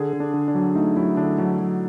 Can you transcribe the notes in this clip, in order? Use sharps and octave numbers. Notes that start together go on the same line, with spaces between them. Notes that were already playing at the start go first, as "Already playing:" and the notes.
Already playing: D3 G#4
D3
D4
D3
D4
F#3
A3 D#4
F#3 E4
D3 D4
F#3
F#3